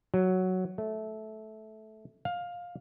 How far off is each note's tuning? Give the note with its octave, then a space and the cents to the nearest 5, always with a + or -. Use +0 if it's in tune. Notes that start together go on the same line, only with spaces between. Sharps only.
F#3 +5
A3 -15
F5 +15